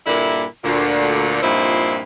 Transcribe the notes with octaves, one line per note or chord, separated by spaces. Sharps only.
G2 A#2 D3 A#3 E4
D2 A#2 D3
G2 A#2 F3 C4 D#4 E4